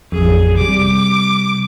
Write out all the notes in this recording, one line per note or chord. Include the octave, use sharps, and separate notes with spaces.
A1 F2 G#4
C3 G3 D6